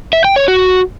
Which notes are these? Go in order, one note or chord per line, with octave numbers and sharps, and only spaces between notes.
E5
G5
C#5
F#4